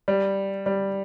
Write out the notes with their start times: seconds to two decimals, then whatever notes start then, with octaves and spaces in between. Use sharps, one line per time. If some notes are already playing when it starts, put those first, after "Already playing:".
0.08 G3
0.66 G3